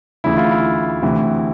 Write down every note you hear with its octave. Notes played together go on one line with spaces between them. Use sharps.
D2 C#3 E3 E4
F4
E4
D2 C3 E3